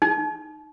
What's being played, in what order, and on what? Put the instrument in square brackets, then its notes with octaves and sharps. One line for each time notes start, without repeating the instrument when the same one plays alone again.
[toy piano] D#4